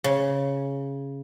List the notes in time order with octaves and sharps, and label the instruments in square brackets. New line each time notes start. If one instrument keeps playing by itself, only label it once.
[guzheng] C#3